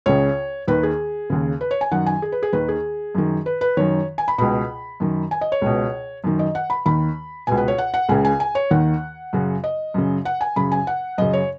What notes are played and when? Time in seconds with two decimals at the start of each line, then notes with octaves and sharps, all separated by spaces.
0.06 C#2 C#3 C#5
0.68 D#2 D#3 B4
0.83 G#4
1.30 D#2 C#3
1.61 B4
1.71 C#5
1.81 G#5
1.92 F#2 D#3 F#5
2.06 G#5
2.22 G#4
2.32 B4
2.43 G#4
2.53 D#2 D#3 B4
2.68 G#4
3.15 F#2 D#3
3.46 B4
3.61 B4
3.77 F#2 D#3 C#5
4.18 G#5
4.28 B5
4.38 C#2 B2 B5
5.00 F#2 D#3
5.31 G#5
5.41 D#5
5.52 C#5
5.62 C#2 B2
6.24 F#2 D#3
6.39 D#5
6.55 F#5
6.70 B5
6.86 D#2 D#3 B5
7.47 C#2 B2 G#5
7.57 B4
7.68 C#5
7.78 F#5
7.94 F#5
8.09 C#2 C#3 G#5
8.25 G#5
8.40 G#5
8.55 C#5
8.71 D#2 D#3 F#5
9.33 F#2 C#3
9.64 D#5
9.94 F#2 C#3
10.25 F#5
10.41 G#5
10.56 F#2 C#3 B5
10.72 G#5
10.87 F#5
11.18 F#2 C#3 D#5
11.33 C#5